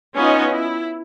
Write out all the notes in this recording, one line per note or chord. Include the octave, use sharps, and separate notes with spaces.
B3 C#4 D#4 F4 D#5
E4